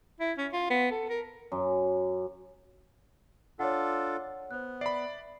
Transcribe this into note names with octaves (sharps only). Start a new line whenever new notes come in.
E4
C#4
F4
B3
A4
A#4
F#2
D4 F4 A4 C#5 F#5
B3 C5 F#6
D5 E5 B5 C7